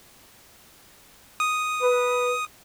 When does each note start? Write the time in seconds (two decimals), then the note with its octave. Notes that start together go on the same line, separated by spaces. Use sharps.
1.40 D#6
1.82 B4